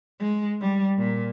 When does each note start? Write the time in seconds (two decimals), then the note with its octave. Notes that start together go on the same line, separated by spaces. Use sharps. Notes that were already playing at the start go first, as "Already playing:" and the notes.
0.20 G#3
0.61 G3
0.98 A#2